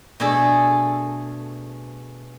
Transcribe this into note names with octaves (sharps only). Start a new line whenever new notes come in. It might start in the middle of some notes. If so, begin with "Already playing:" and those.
B2 A3 D4 G#4 A4